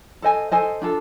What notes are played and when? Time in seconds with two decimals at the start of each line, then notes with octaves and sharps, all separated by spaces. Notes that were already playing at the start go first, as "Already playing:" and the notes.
0.22 A4 C5 D#5 G#5
0.51 A4 C5 D#5 G#5
0.82 D4 F4 A4